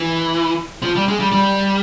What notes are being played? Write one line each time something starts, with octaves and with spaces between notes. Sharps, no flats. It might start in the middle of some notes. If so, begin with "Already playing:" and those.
Already playing: E3
F3
G3
G#3
G3
G3